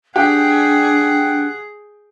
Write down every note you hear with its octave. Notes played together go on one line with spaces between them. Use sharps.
D4 G4 G#4 F#5